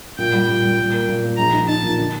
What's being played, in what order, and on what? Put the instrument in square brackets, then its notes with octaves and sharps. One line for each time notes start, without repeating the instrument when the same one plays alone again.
[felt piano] A#2 [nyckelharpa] G5
[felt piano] G3
A#2
G3
A#2
A#3
A#2
A#3
[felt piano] A#1 [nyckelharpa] A#5
[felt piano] D#4
[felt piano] D#4 [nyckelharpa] A5
[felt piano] A#2
D3